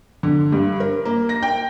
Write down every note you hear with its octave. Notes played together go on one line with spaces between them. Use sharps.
D3
G2
A#4
A#3
A#6
G5